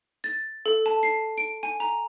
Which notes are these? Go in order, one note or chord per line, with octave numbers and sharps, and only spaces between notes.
A6
A4
A5
C7
D7
G#5
A#5